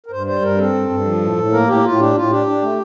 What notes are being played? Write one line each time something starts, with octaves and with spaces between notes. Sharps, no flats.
A#4
G2 C5
G3 C5
G2 A#4
C4 A4
G2
G2
F3
A2
A2
A#3 A#4
A2 G4
A2 F4
D4 G4
A2 F4
D4 G4
D4
A3